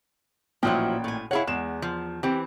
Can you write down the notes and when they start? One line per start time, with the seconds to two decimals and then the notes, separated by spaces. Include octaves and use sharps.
0.63 A1 A#2 F3 F#3 E4 G5
1.04 A2 G#5
1.31 E4 G#4 C#5 F5 F#5 B5
1.47 E2 G#3 E7
1.82 F3
2.23 E3 C4 G4